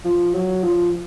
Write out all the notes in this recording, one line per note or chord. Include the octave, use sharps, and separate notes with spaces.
F3
F#3
F3